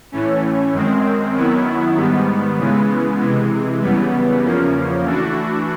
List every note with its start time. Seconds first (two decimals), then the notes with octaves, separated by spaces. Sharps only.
0.12 A2 E3 A3 C#4
0.73 F#2 D#3 G#3 C4
1.35 F#2 D#3 F#3 B3 E4
1.97 G#2 D#3 G3 B3
2.58 C#3 E3 G#3 B3
3.19 C3 E3 G#3
3.81 F#2 C#3 E3 G3 B3
4.43 E2 C#3 F3 A#3 C#4
5.04 E3 A3 D4 F#4